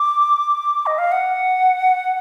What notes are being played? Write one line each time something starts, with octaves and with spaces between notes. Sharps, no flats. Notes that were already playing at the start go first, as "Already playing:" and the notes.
Already playing: D6
D#5
F5
F#5